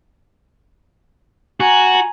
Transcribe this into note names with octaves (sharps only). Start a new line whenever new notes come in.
F#4 G#5 A#5